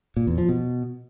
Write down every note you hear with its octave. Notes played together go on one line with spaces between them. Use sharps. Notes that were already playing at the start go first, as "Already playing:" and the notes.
A#2
E2
F3
B2